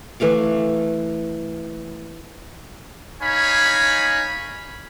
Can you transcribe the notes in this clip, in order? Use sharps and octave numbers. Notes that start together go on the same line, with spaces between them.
E3 A3 F5 D6
D#4 C#5 F5 G#5 B5